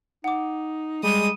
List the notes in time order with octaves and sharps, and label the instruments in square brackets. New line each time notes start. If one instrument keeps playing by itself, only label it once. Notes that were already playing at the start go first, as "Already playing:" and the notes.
[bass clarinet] D#4 [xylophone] F#5 D6
[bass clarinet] G3 [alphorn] G#3 [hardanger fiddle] D#6